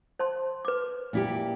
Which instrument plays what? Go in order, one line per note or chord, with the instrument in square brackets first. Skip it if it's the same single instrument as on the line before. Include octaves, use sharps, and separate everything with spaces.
[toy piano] C5 A5 C6
B4 D6
[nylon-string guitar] A#2 E4 G4